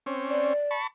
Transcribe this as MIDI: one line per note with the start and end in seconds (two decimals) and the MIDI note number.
0.06 0.53 60
0.06 0.53 61
0.29 0.71 74
0.71 0.87 81
0.71 0.87 83
0.71 0.87 85